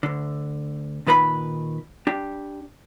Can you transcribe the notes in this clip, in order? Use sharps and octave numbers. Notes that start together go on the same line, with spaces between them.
D2 D3
A#2 D#3 B4 D5 B5
D4 G4